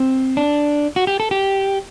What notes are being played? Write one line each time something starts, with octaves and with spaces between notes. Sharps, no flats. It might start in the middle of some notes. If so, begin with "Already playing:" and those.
Already playing: C4
D4
F#4
G4
A4
G4